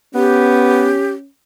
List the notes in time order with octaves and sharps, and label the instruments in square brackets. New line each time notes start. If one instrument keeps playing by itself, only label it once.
[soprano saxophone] B3 [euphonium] C#4 [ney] G4